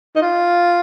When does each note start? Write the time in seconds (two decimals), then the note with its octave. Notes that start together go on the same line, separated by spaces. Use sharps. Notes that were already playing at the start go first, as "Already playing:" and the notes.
0.15 D#4
0.22 F4